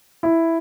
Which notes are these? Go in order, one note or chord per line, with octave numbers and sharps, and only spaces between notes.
E4